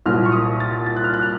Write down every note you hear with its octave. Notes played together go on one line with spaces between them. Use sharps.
C2 A#2 F#3 A#3 F6
C#6
D#6
A6
A6
F#6
F6
F#6
F6